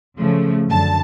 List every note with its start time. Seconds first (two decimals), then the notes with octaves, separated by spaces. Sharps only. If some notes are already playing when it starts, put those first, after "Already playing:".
0.18 C#3 F3 A3
0.68 F#2 D3 A5